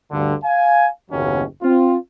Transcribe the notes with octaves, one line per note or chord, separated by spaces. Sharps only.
D2 G2 D3
F5 G#5
F#1 D#2 B2 F#3 C#4
C4 F4